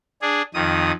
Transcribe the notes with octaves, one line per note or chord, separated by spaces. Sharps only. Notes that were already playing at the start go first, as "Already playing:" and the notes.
D4 G#4
F2 D#3 D#6